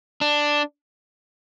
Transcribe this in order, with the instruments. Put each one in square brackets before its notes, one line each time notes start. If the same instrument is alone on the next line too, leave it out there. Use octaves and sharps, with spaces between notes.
[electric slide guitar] D4